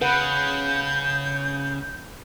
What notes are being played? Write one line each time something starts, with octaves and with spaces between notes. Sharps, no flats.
C#3 B4 F#5 G6